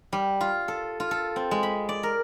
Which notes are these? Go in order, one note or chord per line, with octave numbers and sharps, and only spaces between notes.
G3
F4
A4
F4
A4
C4
G#3
B5
D5
A#4